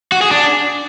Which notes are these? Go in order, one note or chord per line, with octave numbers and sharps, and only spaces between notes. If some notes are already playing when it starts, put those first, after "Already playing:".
F#4
G#4
D4